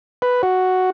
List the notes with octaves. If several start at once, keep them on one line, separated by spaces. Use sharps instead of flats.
B4
F#4